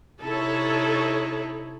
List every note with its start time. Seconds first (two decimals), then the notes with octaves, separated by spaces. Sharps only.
0.23 C3 D#4 E4 A4 C#5